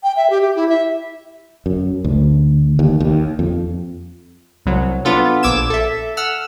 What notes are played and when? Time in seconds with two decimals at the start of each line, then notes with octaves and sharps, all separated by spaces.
0.03 G5
0.16 E5
0.30 G4
0.42 G4
0.56 E4
0.69 E5
1.66 F#2
2.05 D2
2.79 D#2
3.00 D#2
3.39 F2
4.66 C2 F#3
5.05 B3 D4 F4 A4
5.43 A#1 D6 E6 G#6 E7
5.70 A4 E5
6.17 F#5 E6 F6